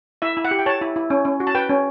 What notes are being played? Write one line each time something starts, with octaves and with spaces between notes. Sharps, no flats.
E4 E5
E4
F#5
G4
G5
C#5 A5
E4
E4
C#4
C#4
F#4
A5
B4 G5
C#4